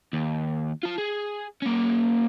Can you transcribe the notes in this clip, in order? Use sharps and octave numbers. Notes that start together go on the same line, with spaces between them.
D#2
F4 A5
G#4
A#3 C#4